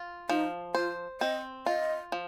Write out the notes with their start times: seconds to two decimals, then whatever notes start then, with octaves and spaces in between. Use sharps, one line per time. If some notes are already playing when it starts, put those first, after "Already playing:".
Already playing: F4
0.29 F3 D#4
0.75 F4 C5
1.21 C4 D#5
1.66 F4 D#5
2.12 F3